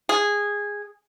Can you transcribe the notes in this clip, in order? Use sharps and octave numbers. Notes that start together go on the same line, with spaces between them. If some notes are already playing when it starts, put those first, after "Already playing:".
G#4